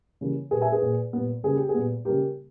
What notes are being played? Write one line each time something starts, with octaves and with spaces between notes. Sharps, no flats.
C#3 E3 G3 A#3
A#2 G3 A#3 G#4 B4
E5 G#5
G#4 B4
A#2 A#3
A#2 G3 B3
C#3 G3 A#3 G#4
G4
G#4
A#2 G3 B3
C#3 G3 A#3 G4 A#4